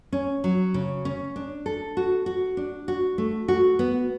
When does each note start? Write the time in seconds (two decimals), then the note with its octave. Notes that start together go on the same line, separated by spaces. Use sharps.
0.12 C#4
0.44 F#3
0.74 C#3
1.05 C#4
1.36 D4
1.66 A4
1.97 F#4
2.26 F#4
2.57 D4
2.88 F#4
3.18 A3
3.48 F#4
3.79 B3